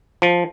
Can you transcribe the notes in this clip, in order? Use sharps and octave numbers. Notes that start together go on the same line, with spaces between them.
F3